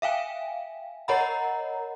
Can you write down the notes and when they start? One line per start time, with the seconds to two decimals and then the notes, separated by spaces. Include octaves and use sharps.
0.02 E5 F5 G5 G#5
1.08 A#4 C#5 D#5 F#5 A#5 B5